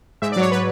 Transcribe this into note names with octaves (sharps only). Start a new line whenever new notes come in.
G#2 E5
D5
F#3 C#5
B4